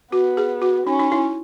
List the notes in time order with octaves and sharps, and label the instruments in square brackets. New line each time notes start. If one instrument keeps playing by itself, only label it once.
[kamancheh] B3 [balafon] F#4
[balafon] G#4
F#4
[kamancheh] C#4 [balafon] D#4
[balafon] D#4
E4